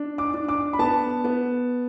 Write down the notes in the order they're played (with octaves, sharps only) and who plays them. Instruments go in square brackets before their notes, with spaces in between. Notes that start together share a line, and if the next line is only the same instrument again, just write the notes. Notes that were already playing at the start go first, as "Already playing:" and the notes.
Already playing: [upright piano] D4
D6
D4
D6
B5
B3 A5
B3